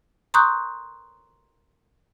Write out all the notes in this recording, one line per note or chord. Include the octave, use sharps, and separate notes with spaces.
A#5 C6 C#6 D#6 F#6 G6